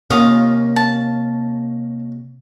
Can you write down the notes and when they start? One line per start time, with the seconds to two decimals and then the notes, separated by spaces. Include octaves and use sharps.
0.10 D#2 C3 A#3 C#4 F4 F5 D#6
0.76 A5